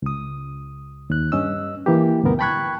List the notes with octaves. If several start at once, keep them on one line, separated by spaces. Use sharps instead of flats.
C#2 D#6
D#2 F#6
G2 C#4 D#5 E6
E3 A#3 G4
D2 G2 B2 B3 A#4
G5 A5 B5 C#6 F#6 G#6